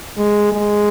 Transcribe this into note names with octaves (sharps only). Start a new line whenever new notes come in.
G#3
G#3